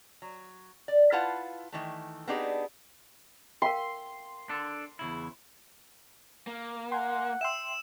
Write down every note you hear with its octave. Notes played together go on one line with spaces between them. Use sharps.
F#3
D5
E4 F4 B4 F5 F#5 A5
D#3 E3 A3
B3 C4 D4 D#4 G4 G#4
A#4 F5 G5 C6
D4 A4
E2 C#3 E4
A#3
F#5 G#5 C6
E5 G5 C6 E6 E7